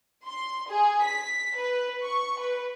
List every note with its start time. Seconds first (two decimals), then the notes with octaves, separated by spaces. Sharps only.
0.24 C6
0.69 G#4
1.03 B6
1.55 B4
2.02 C#6
2.39 B4